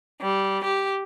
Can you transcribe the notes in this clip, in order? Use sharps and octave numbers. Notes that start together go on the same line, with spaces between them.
G3
G4